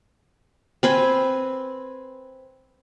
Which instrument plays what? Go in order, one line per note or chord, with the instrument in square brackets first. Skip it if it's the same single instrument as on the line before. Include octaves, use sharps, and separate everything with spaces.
[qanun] C4 B4 G#5